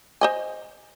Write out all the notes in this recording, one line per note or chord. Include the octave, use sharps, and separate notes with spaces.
C5 D#5 G#5